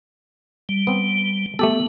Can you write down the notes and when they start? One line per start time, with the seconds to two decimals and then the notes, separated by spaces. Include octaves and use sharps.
0.69 G3
0.87 B3 C4
1.59 A3 B3 G4 A4